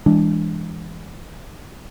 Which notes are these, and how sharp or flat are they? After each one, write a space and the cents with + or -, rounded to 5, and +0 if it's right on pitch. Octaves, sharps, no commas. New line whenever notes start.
E3 +5 G#3 -20 D4 +0